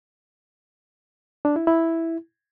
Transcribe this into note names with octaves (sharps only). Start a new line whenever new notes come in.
D4
E4
E4